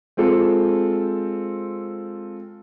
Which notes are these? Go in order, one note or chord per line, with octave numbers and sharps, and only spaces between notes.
G#3 C4 F4 A4